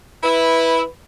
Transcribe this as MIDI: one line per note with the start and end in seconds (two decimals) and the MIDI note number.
0.23 0.81 64
0.23 0.86 71